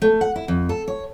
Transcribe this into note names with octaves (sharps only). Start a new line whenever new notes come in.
A3
F#5
E4
F2
A4
C#5